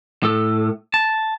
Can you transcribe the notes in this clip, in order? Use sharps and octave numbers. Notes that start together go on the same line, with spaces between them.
A2 A4
A5